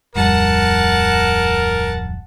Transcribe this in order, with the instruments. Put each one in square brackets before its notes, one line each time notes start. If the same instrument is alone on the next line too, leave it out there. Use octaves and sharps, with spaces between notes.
[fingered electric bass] D1 F2 G3 [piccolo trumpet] A#4 [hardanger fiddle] F#5 A5